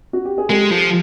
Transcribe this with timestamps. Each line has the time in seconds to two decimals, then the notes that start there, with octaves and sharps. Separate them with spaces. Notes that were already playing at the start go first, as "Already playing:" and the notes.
0.13 F#4
0.25 G4
0.38 G#4
0.50 G#3 G4 A4
0.71 F3